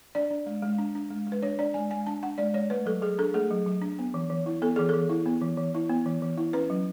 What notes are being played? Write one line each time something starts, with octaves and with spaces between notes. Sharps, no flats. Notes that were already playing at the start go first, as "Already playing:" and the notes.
D4 D5
D4
G#3
G#3
D4
D4
G#3
G#3
B4
D4 C#5
D4 D5
G#3 G#5
G#3 G#5
D4 A5
D4 F#5
G#3 D5
G#3 C#5
A3 B4
F#3 A4
F#3 G#4
D4 A4
A3 G#4
F#3
F#3
D4
B3
E3
E3
E4
B3 A4
E3 G#4
E3 A4
E4
B3
E3
E3
E4
B3
E3
E3
E4
C#4 B4
F#3